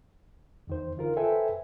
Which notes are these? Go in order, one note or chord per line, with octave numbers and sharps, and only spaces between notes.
E2 D#3 C5
D3 D#3 F4 A#4
A4 B4 C5 E5 G5 G#5